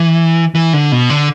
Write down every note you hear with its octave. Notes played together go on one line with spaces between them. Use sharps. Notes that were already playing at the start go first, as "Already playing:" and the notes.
Already playing: E3
E3
D3
B2
D3